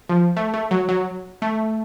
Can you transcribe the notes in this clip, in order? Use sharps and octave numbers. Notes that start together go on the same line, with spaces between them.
F3
A3
A3
F#3
F#3
A3